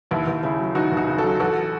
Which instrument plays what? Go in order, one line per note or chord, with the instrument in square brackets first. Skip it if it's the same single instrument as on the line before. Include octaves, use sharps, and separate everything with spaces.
[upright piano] D#2 E4
D#2
C#3 E4
F#3
D#2 D#4 F#4
D#2
D#4 F#4
C#3
F#4 A4
F#3
A1 F#4 A4